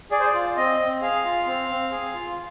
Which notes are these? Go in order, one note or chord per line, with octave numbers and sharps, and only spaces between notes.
G#4 D5
C5
D5
F4
C4 D#5
C4
G#4 F5
F4
C4
C4
G#4
F4